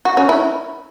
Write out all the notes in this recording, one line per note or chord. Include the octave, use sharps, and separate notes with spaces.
F#4
C#4
E4